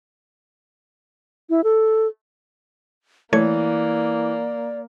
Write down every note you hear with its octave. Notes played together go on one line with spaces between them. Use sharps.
E4
A4
E3 A3 A#3 C#5 D5 G#6